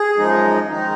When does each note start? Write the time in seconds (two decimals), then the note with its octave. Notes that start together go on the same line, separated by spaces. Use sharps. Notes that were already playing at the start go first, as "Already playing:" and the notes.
Already playing: G#4
0.17 F#2 F3 G#3 D#4
0.70 D#3 G#3 D#4